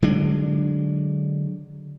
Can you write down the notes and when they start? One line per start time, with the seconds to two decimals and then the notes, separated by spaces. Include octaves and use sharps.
0.02 D3 F#3 G#3 D4